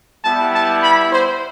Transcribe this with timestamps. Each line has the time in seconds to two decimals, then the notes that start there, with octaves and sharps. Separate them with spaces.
0.25 G3 B3 E4 A5
0.54 A5
0.83 B5
1.12 C5